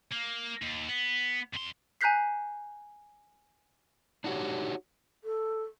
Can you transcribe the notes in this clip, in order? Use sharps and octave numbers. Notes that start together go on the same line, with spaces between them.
A#3
D#2
B3
F2 C6
G#5 A#5 F#6 G6 B6 C7
D4 D#4 F#4 G4 C#5
A4